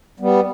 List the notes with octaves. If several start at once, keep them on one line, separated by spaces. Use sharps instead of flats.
G3 B3